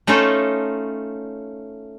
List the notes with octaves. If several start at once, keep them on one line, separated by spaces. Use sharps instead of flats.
A3 C#4 D#4 F4 A4